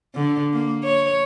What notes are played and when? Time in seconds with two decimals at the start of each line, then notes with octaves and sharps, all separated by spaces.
0.15 D3
0.53 A#3
0.84 C#5